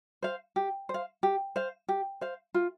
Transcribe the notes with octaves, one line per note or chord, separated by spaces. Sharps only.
C5 F5
G4
C5
F5
G4
C5 F5
G4
C5 F5
F4